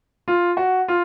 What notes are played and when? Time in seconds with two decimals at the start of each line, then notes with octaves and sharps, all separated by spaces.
0.28 F4
0.57 F#4
0.88 F4